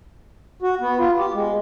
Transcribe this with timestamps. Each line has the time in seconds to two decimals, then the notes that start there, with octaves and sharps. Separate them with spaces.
0.62 F#4
0.81 B3
0.99 F4
1.18 G4
1.33 G#3